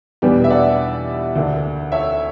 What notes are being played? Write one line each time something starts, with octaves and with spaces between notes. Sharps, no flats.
E2 B2 G3 B3 D4 G4
E5
D5 F#5
D2 D3 A#3 D4
C#5 E5